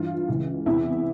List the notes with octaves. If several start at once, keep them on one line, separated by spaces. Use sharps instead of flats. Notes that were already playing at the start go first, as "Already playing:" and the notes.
Already playing: G2 E3 F4
C#2 C#3 E3
E2 C3 E3 E4